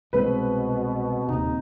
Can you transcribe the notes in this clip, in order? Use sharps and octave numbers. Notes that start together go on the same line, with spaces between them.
C2 B2 G#3 C4 B4
D#1 D#2 C3 D#4